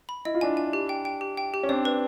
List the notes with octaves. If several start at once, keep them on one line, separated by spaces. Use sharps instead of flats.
B5
E4 D#5
F4
D4 E4 G#5
G#5
G4
G5
G5
G4
G5
G4
C#4
C4 D4 D5
B4